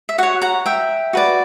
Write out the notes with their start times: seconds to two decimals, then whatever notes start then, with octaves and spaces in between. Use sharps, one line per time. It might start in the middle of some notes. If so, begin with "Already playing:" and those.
0.09 E5
0.18 F#4 C#5 F#5
0.42 F#5 A#5
0.66 E5 G5
1.13 F#4 B4 D5